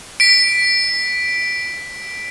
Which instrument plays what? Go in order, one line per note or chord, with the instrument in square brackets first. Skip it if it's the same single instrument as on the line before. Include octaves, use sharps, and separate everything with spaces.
[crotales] B6 D7